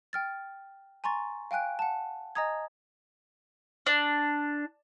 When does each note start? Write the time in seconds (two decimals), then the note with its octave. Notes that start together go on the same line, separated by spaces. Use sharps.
0.13 G5 F6 A6
1.04 G#5 A#5 C6 C#6 A6
1.51 F5 G5 G#5 F#6 D7
1.79 F#5 A5
2.35 D#5 G#5 A#5 D#6 G#6
3.87 D4